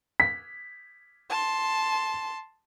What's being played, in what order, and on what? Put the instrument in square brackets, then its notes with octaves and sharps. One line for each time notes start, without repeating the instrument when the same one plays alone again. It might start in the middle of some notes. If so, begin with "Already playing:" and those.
[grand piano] B6
[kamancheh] A5 C6